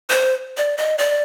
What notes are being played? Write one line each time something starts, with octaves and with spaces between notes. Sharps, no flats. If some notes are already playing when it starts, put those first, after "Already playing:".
C5
D5
D#5
D5